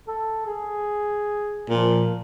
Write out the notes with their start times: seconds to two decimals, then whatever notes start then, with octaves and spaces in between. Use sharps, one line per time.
0.08 A4
0.46 G#4
1.69 A#2 F3